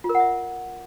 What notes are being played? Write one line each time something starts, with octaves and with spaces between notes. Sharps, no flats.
F4
A#4
F#5
E5